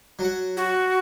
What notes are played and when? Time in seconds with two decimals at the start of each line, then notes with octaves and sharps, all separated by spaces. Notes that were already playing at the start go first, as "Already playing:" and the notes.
0.19 F#3 F#5
0.57 F#4